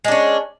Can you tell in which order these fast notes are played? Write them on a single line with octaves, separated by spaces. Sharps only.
G#3 D4 C#4